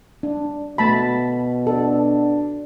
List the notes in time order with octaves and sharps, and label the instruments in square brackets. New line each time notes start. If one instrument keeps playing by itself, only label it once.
[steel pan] D4
[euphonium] B2 [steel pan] A3 A5 B5
[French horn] D4 [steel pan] A4